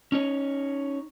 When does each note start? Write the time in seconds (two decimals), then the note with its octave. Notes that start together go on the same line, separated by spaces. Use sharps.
0.12 C#4 D#4 C#5